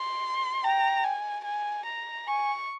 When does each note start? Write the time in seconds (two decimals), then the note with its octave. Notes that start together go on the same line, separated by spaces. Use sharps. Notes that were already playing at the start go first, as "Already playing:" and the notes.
Already playing: C6
0.64 G5 A#5
1.04 G#5
1.45 G#5
1.86 A#5
2.27 G#5 C#6